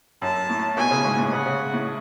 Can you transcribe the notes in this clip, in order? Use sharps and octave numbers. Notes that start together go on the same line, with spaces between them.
F#2 A5
A2
B2 G#5
C#3
G#2
A2
C#3 F#5
C#3
A2